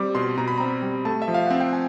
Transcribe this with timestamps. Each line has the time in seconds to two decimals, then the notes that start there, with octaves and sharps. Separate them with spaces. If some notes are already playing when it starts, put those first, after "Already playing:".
Already playing: G3 C4 D6
0.15 B2 C6
0.38 B2 A#5
0.48 B5
0.58 C4 A#5
0.82 G3
1.05 A3 A5
1.22 E5
1.28 F3
1.34 F5
1.47 C4 F#5
1.60 G5
1.73 G#5